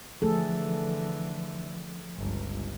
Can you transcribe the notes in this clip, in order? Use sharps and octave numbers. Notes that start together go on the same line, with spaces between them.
D3 E3 F3 A3 G#4 A4
G1 C#2